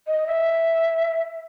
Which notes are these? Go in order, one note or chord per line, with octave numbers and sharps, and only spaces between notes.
D#5
E5